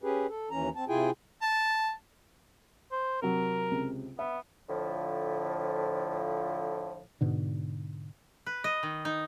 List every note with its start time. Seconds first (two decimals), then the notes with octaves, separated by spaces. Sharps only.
0.03 C#4 G4 G#4 B4
0.29 A4
0.51 D#2 E3 C#4 A#5
0.76 C4 A5
0.88 C3 E4 F4 G#4 G5 G#5
1.42 A5
2.92 C5
3.22 C3 F#3 A#4
3.71 C#2 C3
4.19 B3 E5
4.69 A2 D3 F3
7.21 G#2 B2 D3
8.46 B4
8.64 D#5
8.83 D#3
9.05 D#4